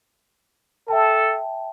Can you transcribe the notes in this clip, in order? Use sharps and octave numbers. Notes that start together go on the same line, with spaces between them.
A4 E5 G5 A5